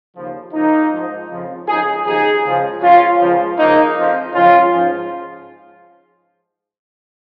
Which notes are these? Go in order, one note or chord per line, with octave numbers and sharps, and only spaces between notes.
D#2 C#3 F3
C#2 C#3 F3 A#3 D#4
G#2 F3
F2 C#3 F3
C#2 C#3 F3 D#4 G#4
D#2 C#3 F3 D#4 G#4
C#2 C#3 F3
C#2 C#3 F3 C#4 F4
C#2 C#3 F3
C#2 C#3 F3 A#3 D#4
F2 F3
C#2 C#3 F3 C#4 F4
G#2 F3